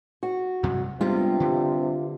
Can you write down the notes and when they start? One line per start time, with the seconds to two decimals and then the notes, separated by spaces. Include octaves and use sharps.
0.23 F#4
0.63 G2 C3 F#3
1.01 G2 C3 G3 G#3 B3 F4
1.40 D3